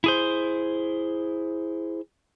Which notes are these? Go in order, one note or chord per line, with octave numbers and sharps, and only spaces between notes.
E4 G#4 C5